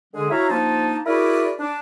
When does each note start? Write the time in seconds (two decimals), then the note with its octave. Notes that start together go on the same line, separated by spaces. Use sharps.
0.14 D3 G#3 G#4
0.30 E4 F#4 C#5 E5 F5 A#5
0.50 F3 A#3 D4 D#4 A5
1.07 E4 F#4 G#4 A#4 B4 D5
1.59 D4